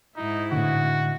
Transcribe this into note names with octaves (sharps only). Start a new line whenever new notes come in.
G#2 D#4 E4
A2 D3 F#4